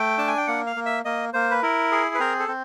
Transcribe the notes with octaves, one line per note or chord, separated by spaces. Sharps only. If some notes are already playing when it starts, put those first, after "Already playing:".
Already playing: A3 G5
D4 A5
G#5
G5
A#3 F#5
F5
A#3
E5
A#3 D#5
A#3 C5
B4
E4 A#4
G#4
B4
C4 A#4
A4
C4